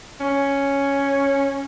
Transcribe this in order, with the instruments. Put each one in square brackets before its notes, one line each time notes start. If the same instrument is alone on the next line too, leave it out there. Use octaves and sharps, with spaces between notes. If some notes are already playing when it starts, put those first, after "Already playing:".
[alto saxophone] C#4